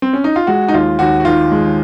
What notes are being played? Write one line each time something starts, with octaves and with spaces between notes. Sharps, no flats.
C4
C#4
D#4
F4
G#3 F#4
D#4
D#2 F4
D#2 F#4
F#4
D#3 F4
G#3